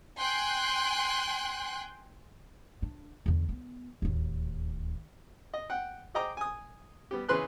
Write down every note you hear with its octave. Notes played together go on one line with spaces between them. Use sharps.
G5 G#5 C6 F#6
D4
E2 D3
B3
D1 D#2
D#5
F#5 G5
G#4 C5 D#5 G5 A#5 D6
G#5 D#6
G3 B3 G4
C#3 E3 G#4 B4 C6 F#6